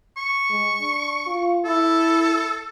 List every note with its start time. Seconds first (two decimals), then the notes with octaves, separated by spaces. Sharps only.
0.17 C#6
0.50 G#3
0.81 D4
1.27 F4
1.65 E4 A4